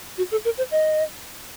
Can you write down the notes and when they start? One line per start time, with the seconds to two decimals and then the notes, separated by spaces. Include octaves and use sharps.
0.18 F#4
0.31 A4
0.45 A#4
0.58 C5
0.71 D#5